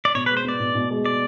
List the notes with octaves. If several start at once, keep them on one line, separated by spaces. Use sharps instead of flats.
D5
B2 C#5
B4
G#3
C5
B3 D5
B2
B2
G#3
D5